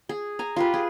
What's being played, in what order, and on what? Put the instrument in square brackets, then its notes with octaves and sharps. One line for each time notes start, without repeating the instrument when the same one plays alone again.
[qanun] G#4
G#5 A#5
F4 G4 B4
G#4